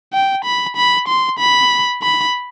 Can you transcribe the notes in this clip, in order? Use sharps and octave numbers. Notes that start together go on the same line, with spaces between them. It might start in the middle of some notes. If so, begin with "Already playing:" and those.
G5
B5
B5
C6
B5
B5